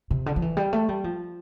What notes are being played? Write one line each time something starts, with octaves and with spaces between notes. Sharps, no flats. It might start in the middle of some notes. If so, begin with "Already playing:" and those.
C3
D3
F3
E3
G3
A3
G3
F3